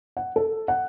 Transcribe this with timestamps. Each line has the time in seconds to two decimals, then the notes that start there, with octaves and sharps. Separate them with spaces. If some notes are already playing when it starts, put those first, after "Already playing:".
0.17 F#5
0.36 A4
0.68 F#5